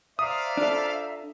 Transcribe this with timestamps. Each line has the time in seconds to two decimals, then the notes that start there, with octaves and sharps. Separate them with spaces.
0.19 C5 D5 E5 F5 A#5 D#6
0.57 D4 F4 A4